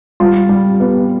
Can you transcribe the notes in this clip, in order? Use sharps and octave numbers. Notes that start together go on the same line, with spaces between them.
G3 F4
G3
B3